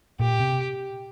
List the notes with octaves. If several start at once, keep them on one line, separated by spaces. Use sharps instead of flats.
A#2 G4
C3